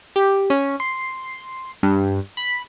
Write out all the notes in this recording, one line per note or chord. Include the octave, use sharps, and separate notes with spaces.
G4
C#4
C6
G2
B5